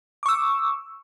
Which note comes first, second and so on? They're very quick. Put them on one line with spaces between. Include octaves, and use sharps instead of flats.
D6 C#6 E6